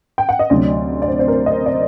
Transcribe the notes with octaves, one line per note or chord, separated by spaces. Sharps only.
G5
F#5
D#5
D2 C3 F#3 D5
D5
C5
C5
A#4
D#5
D5